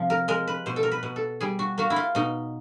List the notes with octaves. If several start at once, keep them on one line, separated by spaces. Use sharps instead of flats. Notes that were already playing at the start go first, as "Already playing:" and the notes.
Already playing: C3 F3
A#4
G#3 A#4
B4
B2 C5
A4
A#4
B4
B2
A4
G3 G#4
F#4
A#3 F#4
E4
F4
B2 D#4